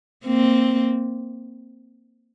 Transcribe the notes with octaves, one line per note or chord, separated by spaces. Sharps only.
A#3 C4